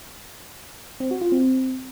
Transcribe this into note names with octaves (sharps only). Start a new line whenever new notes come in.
C4
F#4
F4
C4